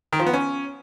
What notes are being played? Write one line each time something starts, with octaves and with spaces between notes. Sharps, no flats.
D#3
F3
B3
C#4